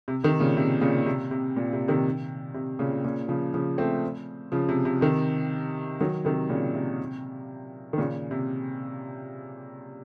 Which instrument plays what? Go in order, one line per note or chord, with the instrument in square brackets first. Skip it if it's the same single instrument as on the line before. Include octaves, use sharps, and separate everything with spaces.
[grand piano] C3
C3 D#3
A#2 C#3
C3
A#2 C#3
C3
C3
A#2
C3
C3 D#3
C3
A#2 C#3
A#2 C#3
C#3 F3
C#3 F3
A3 C4
C#3 F3
C3
C3
C3 D#3
D#3 F#3
C3 D#3
A#2 C#3
C3
D#3
A#2 C#3
C3